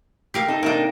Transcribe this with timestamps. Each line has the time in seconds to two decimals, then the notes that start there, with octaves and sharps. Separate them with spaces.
0.34 G4 A#4 F5
0.48 D#4 A4
0.63 C3 A#3 D4 D#4 G5